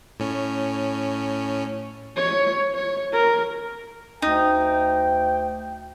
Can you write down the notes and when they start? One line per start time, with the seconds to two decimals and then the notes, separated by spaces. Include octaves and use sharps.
0.20 A2 C#4
2.16 C#5
2.74 C#5
3.13 A#4
4.22 D2 D#4 G5